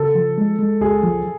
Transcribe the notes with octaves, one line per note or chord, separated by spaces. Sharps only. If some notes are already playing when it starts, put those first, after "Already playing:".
Already playing: C#3 A4
F3
G#3
G#3
C#2 G#4
F3